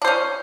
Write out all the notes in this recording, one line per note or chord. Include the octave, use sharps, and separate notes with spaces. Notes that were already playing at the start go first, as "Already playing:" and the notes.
C#4 D4 C5